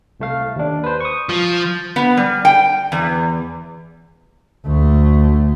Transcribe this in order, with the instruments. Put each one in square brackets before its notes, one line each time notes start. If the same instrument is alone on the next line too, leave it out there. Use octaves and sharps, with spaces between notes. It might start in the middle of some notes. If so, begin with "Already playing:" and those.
[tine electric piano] C2 A3 F5
D#2 D4
B4 C5
C#6 D#6
[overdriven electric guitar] F3
[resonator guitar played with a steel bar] B3
G3
G5
E2
[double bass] D2 A3